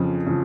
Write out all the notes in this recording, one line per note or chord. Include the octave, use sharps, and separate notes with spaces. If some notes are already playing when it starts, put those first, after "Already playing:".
Already playing: F2 C#3 F3
C#3 F3